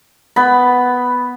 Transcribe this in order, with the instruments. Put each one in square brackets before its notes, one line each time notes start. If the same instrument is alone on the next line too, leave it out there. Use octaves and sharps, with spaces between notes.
[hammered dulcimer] B3 B5